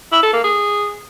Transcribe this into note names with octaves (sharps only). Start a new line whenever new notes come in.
E4
A4
A#3
G#4